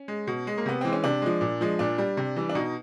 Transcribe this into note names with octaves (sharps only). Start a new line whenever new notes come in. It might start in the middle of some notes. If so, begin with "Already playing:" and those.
Already playing: C#4
G#3
B2
G#3
A#3
C3 B3
E3 G#3 C4
C#4
C3 D4
F3 G#3
A#2
F3 G#3
A#2 D4
G3
C3
E3 G3
D4
B2 D#4